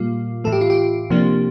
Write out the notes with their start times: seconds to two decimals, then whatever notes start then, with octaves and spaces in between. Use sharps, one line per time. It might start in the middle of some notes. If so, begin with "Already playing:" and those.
Already playing: A#2 G3 A#3 F4
0.44 A2 E3 A3 A4
0.52 G4
0.61 F4
0.70 G4
1.10 C3 F3 A#3 D4